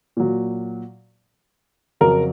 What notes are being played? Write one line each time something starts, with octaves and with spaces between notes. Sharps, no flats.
A#2 F#3
F2 C#3 F#3 A#4